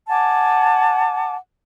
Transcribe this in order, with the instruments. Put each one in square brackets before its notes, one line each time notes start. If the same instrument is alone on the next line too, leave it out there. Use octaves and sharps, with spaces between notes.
[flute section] F#5 G#5 A5 D6